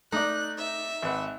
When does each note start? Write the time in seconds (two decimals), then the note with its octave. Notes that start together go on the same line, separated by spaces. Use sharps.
0.12 A3 D#4 D5 F#6
0.58 E5
1.02 G#1 B4 F#5